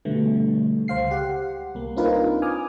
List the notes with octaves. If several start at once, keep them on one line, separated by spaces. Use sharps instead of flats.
B2 D3 G3 A3 B3
C#2 C5 F5 C7
G4 F#5
C2 A#3
C4 D4 D#4 F4 A#4 B4
G#5 D6 D#6 F6